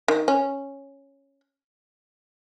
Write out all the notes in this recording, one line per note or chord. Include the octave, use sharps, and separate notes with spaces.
D#3
C#4